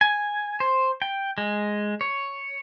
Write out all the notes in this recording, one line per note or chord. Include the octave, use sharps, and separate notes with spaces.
G#5
C5
G5
G#3
C#5